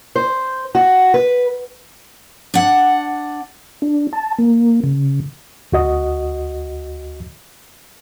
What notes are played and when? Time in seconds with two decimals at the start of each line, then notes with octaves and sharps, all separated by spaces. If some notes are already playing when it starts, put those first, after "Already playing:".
0.16 C5
0.75 F#4
1.14 B4
2.54 D4 F#5
3.82 D4
4.13 A5
4.39 A#3
4.84 C#3
5.72 D2 F#4 D#5